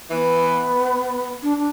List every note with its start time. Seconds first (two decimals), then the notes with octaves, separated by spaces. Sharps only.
0.10 E3 B3
1.42 D4
1.56 D4